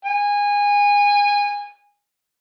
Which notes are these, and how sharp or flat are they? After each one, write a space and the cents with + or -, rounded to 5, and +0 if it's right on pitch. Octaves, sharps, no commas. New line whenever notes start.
G#5 -20